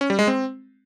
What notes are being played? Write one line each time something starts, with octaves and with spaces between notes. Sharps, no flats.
C#4
G3
G#3
C4